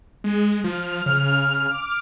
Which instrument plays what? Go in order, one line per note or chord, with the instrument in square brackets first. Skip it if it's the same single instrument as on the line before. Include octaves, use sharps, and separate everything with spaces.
[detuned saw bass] G#3
[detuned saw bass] F3 [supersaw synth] F6
[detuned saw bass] C#3
[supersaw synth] D6